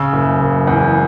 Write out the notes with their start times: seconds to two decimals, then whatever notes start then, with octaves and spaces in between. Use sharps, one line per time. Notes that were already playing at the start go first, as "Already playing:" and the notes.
Already playing: C#3 E6
0.13 F#1
0.40 F#1
0.67 E2